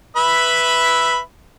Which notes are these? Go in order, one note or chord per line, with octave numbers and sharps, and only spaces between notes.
B4 E5 B5